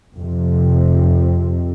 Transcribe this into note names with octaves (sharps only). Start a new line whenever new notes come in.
F2 C3